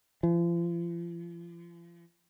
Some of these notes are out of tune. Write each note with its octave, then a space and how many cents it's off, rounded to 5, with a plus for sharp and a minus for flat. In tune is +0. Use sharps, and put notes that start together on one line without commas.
F3 -40